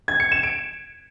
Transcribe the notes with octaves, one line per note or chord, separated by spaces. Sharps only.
G#6
C#7
E7
D7